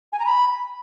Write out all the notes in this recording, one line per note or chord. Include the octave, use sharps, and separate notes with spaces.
G#5
A#5
B5